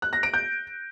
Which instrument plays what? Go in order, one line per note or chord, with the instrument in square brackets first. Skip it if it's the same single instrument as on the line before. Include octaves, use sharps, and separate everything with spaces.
[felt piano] F#6
A#6
D7
G6